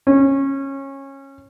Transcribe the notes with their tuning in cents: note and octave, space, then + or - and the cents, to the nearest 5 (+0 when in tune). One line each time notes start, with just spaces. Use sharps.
C#4 -20